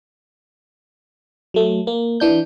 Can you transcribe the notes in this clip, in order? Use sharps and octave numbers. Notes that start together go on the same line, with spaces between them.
F#3 A3
A#3
E3 D4 G6